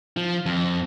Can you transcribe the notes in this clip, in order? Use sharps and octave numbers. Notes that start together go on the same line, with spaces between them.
F3
F2